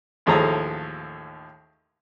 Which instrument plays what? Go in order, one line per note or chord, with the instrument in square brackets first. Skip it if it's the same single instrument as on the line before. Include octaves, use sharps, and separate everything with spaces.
[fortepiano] A1 D#2 F3 G#4 A4 A#5